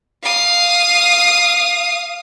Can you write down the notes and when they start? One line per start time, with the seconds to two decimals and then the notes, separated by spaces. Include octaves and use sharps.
0.24 F5 D#6